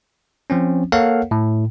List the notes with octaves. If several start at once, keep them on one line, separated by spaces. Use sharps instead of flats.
F3 C4 C#4
A#3 A4 A#4 C#5 F5 F#5
A2